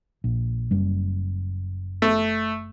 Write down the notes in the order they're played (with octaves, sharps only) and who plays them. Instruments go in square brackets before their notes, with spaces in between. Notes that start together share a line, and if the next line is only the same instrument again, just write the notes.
[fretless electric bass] A#1
F#1 F#2 G3
[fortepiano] A3